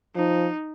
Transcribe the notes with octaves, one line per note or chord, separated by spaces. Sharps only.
F3 D#4